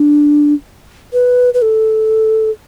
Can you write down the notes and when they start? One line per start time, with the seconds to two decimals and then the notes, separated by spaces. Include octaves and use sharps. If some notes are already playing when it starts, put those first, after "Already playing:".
Already playing: D4
1.13 B4
1.54 B4
1.62 A4